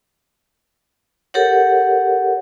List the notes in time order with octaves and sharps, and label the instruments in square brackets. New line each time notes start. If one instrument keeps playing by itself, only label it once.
[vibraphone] G4 A4 A#4 C#5 F#5